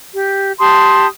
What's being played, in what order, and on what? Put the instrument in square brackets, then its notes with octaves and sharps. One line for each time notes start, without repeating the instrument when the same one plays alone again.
[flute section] G4
G4 A5 C6 D#6